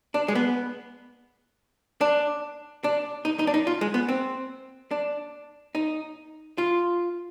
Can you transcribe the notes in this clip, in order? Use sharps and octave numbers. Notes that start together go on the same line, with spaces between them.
D4
G#3
B3
D4
D4
D#4
D#4
D4
D#4
F4
G#3
B3
C4
D4
D#4
F4